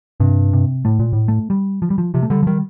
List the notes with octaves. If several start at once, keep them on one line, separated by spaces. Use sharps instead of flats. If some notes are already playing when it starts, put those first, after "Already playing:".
G2 C3
C3
A2 A3
A#2
A2
A3
G3
F3
G3
F3
C3 F3
A3
D3 G3
F3
D#3 G3